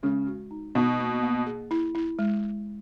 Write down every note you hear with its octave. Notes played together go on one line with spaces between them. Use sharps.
C#3 G#3
F#4
D#4
B2 D#4
A#3
A#3
G#4
E4
E4
G#3